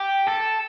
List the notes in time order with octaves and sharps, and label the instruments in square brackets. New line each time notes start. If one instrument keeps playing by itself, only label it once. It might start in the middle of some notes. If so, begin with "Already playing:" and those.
Already playing: [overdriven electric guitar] G4
A4